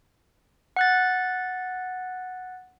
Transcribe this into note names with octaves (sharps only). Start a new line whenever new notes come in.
F#5 F#6 A6